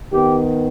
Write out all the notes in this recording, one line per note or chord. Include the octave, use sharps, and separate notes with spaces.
D#3 B3 G4